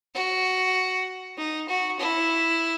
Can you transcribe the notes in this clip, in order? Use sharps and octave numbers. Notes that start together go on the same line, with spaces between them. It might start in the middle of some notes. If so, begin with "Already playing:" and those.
F#4
D#4
F#4
E4